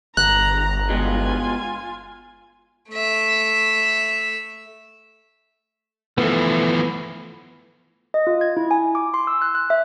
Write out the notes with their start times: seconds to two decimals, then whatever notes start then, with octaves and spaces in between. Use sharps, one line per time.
0.17 G1 A#5 F#6
0.90 B2 G#3 F4 G#5
2.90 A3 E5
6.18 E3 F3 A3 B3
8.14 D#5
8.27 F4
8.41 G#6
8.57 E4
8.71 G#5
8.95 D6
9.14 C6
9.27 E6
9.42 F#6
9.55 F#6
9.70 E5